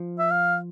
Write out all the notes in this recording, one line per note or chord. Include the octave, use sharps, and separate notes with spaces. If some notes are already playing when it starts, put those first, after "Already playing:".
Already playing: F3
E5
F5